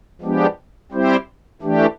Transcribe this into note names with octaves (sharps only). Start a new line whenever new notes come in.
F3 G#3 B3 D4 G4
G3 C4 E4 G4 C5
E3 A3 D4 G4